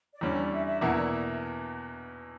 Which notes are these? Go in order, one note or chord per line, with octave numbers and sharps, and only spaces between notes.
D5
E2 D3 G3 C#4 C#5
D5
E5
E5
E2 B2 A#3 E4 F#5
D5
F#5
E5